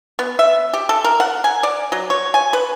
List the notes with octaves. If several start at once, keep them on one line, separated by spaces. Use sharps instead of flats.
B3
E5
G4
A4
A#4
F#5
G#5
D5
F#3
C#5
G#5
B4